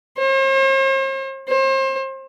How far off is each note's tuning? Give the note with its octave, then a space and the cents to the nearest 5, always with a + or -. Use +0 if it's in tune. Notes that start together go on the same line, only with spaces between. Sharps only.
C5 +45
C5 +35